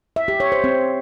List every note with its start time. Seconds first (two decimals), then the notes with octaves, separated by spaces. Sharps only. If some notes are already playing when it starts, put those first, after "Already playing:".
0.16 E5
0.28 G4
0.40 C#5
0.52 C5
0.64 C4